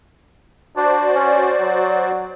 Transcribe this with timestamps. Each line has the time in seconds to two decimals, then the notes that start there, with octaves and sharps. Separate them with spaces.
0.77 D4 F#4 C5 D5
1.14 C#4
1.60 F#3